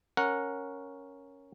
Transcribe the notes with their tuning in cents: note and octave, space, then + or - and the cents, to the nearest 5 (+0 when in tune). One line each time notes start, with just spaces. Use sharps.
C#4 +0 A#4 +0 F#5 -15